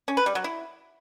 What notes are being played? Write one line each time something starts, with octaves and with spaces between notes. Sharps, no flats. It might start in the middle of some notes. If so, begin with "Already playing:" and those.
C#4
B4
G3
F#3
E4